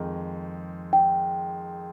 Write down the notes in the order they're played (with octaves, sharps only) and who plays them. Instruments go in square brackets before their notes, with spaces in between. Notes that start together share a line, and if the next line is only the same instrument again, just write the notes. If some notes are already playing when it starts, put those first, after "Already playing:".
Already playing: [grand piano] F2 D#3 G#3 D#4
[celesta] G5